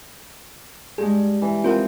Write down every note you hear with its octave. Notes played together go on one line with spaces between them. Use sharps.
G2 G#3 G#4
E3
F3 C4 F4 A#4 F#5